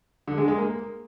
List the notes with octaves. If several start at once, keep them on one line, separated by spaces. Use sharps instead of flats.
D3
G#3
G#3
A#3